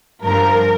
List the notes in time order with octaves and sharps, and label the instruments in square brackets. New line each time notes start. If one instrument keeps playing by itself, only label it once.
[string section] G2 F3 A#4